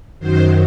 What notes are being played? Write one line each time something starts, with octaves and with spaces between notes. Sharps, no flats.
F#2 D#3 F#3 C5